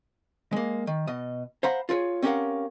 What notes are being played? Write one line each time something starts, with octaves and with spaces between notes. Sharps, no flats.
G#3 A#3
D#3
B2 D#5
C5 F5 F#5 A#5 B5
F4 G#4 A#4 C#5
C4 C#4 G4 A#4 F5 F#5